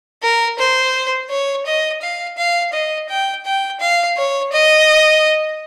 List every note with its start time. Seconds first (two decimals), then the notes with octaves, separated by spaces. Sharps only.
0.22 A#4
0.58 C5
1.30 C#5
1.66 D#5
2.02 F5
2.37 F5
2.73 D#5
3.09 G5
3.45 G5
3.80 F5
4.17 C#5
4.52 D#5